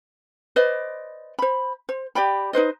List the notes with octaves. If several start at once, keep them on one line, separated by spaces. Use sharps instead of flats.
B4 C5 D5 D#5
C5 B5
C5
G4 D5 G5 B5
D#4 B4 C5 D#5